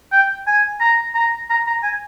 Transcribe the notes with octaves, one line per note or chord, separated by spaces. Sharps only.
G5
G#5
A#5
A#5
A#5
A#5
G#5